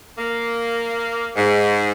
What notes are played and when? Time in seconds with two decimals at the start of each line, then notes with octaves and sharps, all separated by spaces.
0.17 A#3
1.36 G#2